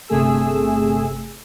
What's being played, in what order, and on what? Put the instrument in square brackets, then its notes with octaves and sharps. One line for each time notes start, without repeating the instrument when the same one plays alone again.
[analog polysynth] G1 C3 A3 G#4 E6